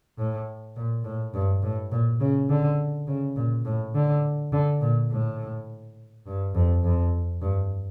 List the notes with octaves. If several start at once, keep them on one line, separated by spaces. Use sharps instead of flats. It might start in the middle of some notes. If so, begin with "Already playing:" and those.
A2
A#2
A2
G2
A2
A#2
C#3
D3
C#3
A#2
A2
D3
D3
A#2
A2
G2
F2
F2
G2